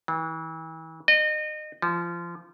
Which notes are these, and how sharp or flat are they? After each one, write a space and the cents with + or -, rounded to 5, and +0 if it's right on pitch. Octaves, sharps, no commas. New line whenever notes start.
E3 -35
D#5 -30
F3 -25